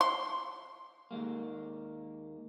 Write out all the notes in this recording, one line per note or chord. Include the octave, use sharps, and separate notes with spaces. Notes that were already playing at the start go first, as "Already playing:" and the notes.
C6
D#2 G#3 A#3